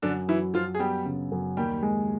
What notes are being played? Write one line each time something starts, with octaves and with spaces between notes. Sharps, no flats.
F#2 D3 D4
E3 F#3 E4
F#2 F3 F4
G#4
G3 B3 G4
C#3
F#2
D#2 G3 G4
G#3